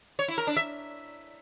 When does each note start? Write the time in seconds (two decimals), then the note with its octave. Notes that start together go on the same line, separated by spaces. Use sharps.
0.19 C#5
0.28 E4
0.38 A#4
0.47 D4
0.57 E5